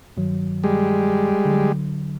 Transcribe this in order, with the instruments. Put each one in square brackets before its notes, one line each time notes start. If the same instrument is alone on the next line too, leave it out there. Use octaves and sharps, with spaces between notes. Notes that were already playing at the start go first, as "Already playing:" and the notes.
[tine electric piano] G2 D#3 F#3
[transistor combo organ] G3 G#3
[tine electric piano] D3 F#3